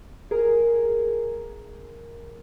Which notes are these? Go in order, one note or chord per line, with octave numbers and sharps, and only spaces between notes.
G#4 A#4